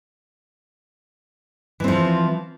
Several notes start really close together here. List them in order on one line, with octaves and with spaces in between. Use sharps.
E3 C4 F3